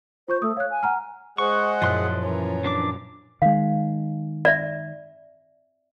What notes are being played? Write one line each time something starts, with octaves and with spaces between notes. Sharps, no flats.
F4 C5 C#6 G6
A3 D#6 E6
C#5 F5 F#6
G#5
F#5 A#5 F6
G#3 G#4 C5 D#5 F#5 C#6
F#2 A#2 F3 E4 C6 F#6
E3 C#4 A#4
F3 D4 D6
D#3 G#3 F5
D5 E5